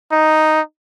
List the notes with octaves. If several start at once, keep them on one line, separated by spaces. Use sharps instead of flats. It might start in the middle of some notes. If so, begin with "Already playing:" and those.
D#4